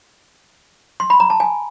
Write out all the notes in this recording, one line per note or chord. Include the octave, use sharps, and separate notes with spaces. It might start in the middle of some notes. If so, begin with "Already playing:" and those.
C6
B5
A#5
A5
G#5